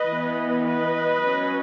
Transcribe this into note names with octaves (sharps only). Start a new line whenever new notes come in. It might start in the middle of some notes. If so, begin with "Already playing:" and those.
Already playing: B4 D#5
E3 B3
B4 D#5
F#3 C#4